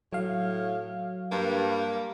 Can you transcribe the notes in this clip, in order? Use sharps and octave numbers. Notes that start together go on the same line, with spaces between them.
A2 F#3 F5
G2 A#3